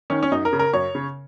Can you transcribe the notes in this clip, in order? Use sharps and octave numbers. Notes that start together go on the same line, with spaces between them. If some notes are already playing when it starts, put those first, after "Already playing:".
D#3 C#4
C#4
F#2 D#4
A#4
C#3
A#4
F#2 C#5
C#3